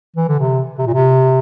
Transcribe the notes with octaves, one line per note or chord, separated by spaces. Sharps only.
E3
D3
C3
C3
A#2
C3